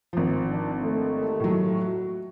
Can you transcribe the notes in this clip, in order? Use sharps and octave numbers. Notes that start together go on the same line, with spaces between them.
G#1 F3
D4
D#2 D#3 A3
A2 F#3
F#4